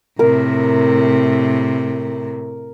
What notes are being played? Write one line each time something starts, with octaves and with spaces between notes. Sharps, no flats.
A2 C3 A#4